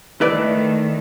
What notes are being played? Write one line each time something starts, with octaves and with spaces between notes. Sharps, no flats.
D#3 A3 E4 B4 D5